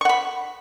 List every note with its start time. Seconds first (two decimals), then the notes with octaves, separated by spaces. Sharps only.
0.01 C#6
0.05 F#5
0.09 B5